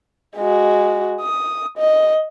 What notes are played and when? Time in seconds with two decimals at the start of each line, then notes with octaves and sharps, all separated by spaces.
0.37 G#3 F#4
1.21 D#6
1.78 D#5